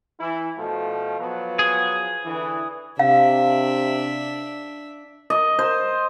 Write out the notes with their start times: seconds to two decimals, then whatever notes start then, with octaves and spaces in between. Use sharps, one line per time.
0.20 E3 E4
0.57 B2 F3 A3
1.19 F3 F#3 B3
1.59 G#4
2.24 D3 E3
2.99 C3 D4 E5 F5
5.30 D#5
5.59 C5